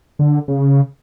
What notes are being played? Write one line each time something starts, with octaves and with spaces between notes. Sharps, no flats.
D3
C#3